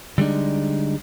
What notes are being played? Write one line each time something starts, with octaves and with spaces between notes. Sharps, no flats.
D3 G3 G#3 D4 D#4